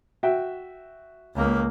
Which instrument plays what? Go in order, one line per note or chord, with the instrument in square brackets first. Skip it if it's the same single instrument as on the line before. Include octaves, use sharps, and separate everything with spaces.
[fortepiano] F#4 E5 G5
[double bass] C#2 A#3